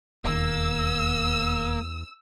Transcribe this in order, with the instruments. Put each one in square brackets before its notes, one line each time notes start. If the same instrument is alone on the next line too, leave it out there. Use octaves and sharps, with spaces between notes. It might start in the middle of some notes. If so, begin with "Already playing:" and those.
[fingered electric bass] D#1 D#3 [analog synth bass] E2 [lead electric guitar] A#3 [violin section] E6